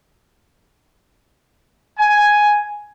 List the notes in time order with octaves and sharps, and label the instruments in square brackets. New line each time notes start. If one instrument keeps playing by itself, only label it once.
[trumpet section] G#5